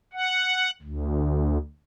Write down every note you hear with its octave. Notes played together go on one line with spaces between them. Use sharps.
F#5
D2